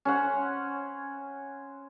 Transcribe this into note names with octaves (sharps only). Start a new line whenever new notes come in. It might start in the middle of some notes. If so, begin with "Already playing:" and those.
C#4 C5 F#5